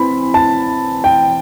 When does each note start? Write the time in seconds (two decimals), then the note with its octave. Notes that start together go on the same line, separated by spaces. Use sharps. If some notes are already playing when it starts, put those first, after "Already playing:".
Already playing: E3 C4 B5
0.34 A5
1.04 G5